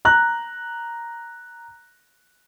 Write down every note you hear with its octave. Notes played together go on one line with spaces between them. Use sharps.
A#5 F#6